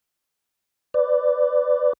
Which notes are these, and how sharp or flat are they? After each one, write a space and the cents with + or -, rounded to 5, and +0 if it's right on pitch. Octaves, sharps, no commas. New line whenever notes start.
B4 +25 D5 +0